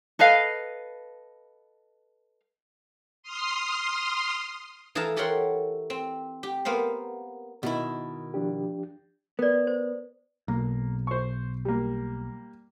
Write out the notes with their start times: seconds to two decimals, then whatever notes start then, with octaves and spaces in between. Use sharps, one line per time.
0.19 A4 B4 D#5 F5
3.23 C6 D#6 F6 C7
4.95 E3 G#4 A4 F5 A5 A#5
5.16 G4 A4 A#4 C#5 F#5 C6
5.90 C4
6.43 G4
6.65 A#3 B3 C5 F5
7.63 B2 D#3 E4
8.34 F3 D4 G4
9.39 B3 A#4 D5
9.67 C5
10.48 B1 A#3
11.07 C5 C#6
11.65 G3 A#3